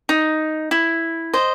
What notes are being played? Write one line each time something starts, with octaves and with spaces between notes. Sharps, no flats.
D#4
E4
C5 D#5